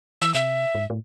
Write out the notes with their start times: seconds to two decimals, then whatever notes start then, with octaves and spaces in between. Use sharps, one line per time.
0.22 E3 E6
0.34 C3 E5
0.75 G#2
0.90 A2